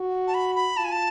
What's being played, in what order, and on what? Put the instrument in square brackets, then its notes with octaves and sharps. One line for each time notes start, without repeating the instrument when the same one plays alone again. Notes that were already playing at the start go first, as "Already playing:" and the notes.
Already playing: [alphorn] F#4
[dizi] A5
B5
B5
[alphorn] F4 [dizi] A5
[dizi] G#5
A5